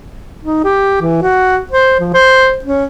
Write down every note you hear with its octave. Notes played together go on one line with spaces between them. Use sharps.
D#4
G4
E3
F#4
C5
F3
C5
C#4